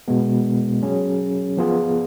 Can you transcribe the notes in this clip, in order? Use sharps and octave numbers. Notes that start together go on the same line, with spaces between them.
B2 G#3 B3
F#3 C#4 G#4
F3 B3 F4 G#4